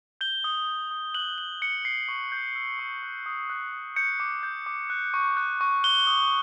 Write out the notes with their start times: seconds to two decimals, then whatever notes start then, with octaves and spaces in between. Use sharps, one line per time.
0.21 G6 G7
0.44 D#6
0.68 G6
0.91 D#6
1.15 F#6 F#7
1.38 D#6 F#7
1.61 F#6 C#7
1.85 D#6 C7
2.08 C#6
2.32 G6
2.56 E6
2.79 C#6
3.03 F#6
3.26 D#6
3.50 F#6
3.73 D#6
3.96 G6 C#7
4.20 D6
4.43 G6
4.66 D6
4.90 F#6
5.14 C#6
5.37 F#6
5.61 C#6
5.84 F#6 G7
6.07 D#6